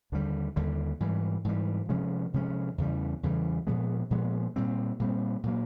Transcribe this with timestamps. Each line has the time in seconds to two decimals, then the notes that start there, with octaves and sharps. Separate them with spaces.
0.12 D#2 D3 G3
0.56 D#2 D3 G3
1.00 G#2 E3 G3
1.44 G#2 E3 G3
1.89 C3 F3 G#3 C#4
2.34 C3 F3 G#3 C#4
2.78 E2 C#3 E3 G3
3.23 E2 C#3 E3 G3
3.67 A#2 F3 G#3 B3
4.10 A#2 F3 G#3 B3
4.56 A#2 G3 C4
5.00 A#2 G3 C4
5.43 A#2 F#3 A#3